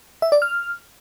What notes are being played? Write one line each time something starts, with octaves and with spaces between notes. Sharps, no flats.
E5
D5
F6